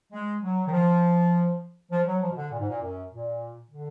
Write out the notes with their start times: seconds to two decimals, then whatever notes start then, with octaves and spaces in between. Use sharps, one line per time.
0.12 G#3
0.42 F#3
0.67 D#3
0.72 F3
1.91 F3
2.07 F#3
2.22 F3
2.31 B2
2.37 D3
2.52 A#2
2.60 G#2
2.68 A#2
2.82 F#2
3.12 A#2
3.71 D3